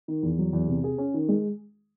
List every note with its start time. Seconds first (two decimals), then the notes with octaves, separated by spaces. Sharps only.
0.08 D#3
0.23 E2
0.38 F#3
0.53 E2
0.68 C3
0.84 G#4
0.98 C#4
1.14 D#3
1.29 G#3